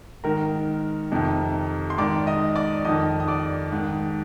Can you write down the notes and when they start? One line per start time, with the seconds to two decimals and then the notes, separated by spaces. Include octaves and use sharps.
0.24 G#2 D#3 A#4 A#5
1.12 F2 C3 D#3
1.90 C6
1.98 G#2 D#3 D5 D6
2.27 D#5 D#6
2.55 D5 D6
2.84 F2 D#3 D#5 D#6
3.20 D#6
3.28 D5 D6
3.72 G#2 D#3